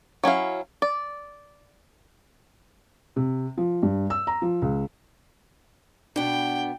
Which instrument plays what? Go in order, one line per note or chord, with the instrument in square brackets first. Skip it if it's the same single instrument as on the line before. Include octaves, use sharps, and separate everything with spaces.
[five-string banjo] F#3 C#4 E4 F5
D5
[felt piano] C3
F3
G2
E6
A#5
F3
C#2
[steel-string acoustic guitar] B2 B3 [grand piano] D4 [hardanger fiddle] G5